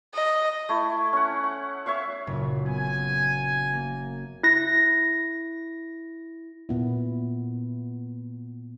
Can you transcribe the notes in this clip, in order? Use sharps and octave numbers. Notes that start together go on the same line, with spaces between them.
D#5
A3 E4
C#4 F#5
F#5
C#5 E5 F5 C#6
F#1 A#2
B3 G#5
A#3
E4 A#6
A#2 B3 E4